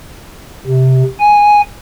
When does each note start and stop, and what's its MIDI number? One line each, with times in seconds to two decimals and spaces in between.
0.67 1.02 48
1.20 1.61 80